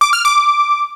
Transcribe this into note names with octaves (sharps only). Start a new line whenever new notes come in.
D6
F6
D6